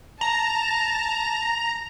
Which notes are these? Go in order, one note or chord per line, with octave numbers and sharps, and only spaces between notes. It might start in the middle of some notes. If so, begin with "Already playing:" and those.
A5 A#5